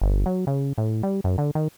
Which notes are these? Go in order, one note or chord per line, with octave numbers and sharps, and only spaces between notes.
G1
F#3
C#3
A2
G3
F#2
D3
D#3